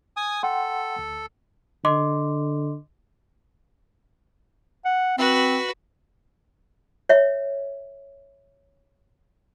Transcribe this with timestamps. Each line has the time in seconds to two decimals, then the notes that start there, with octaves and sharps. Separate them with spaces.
0.17 G#5 D#6
0.43 A4 F#5 G5 C6
0.99 D2
1.85 D3 D#5 C6 D6
4.85 F#5
5.18 C4 F#4 B4
7.09 C#5 E5